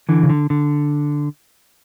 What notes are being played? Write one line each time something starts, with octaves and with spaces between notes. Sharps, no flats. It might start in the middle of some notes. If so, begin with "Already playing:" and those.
D3 E3
C#3
D3
D3